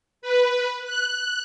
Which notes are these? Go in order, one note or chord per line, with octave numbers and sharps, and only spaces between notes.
B4
F#6